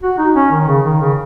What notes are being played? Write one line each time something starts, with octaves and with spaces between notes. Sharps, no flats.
F#4
D#4
C#4
D#3
C#3
D#3
C#3